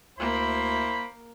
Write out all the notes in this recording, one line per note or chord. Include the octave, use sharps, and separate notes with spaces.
D2 A#3 E4 C5 B5